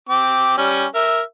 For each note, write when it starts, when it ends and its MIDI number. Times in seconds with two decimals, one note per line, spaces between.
0.09 0.53 60
0.09 0.53 86
0.58 0.85 55
0.58 0.85 61
0.95 1.21 70
0.95 1.21 76